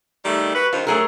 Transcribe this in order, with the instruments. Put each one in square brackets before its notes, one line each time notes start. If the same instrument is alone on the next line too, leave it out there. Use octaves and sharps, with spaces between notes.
[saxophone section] D#3 G3 A3
F#4 B4
[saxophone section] G2 D#3 C5 [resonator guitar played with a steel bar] F4
[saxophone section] F#3 [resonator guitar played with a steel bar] A3 G#4 A#4